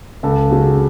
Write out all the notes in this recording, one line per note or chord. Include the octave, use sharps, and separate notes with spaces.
C#2 A4
C#3 F#3